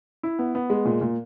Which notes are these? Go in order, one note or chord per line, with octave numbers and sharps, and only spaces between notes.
E4
B3
B3
G#3
A#2
A#2